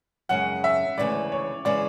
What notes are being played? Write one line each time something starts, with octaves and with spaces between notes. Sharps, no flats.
F#2 C#3 G#3 F#5
E5
D2 C#3 E3 G#3 D5
C#5
C#3 E3 G#3 D5